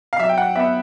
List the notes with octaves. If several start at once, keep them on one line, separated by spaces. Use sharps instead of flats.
F5
F#3 E5
G5
F#5
B3 E5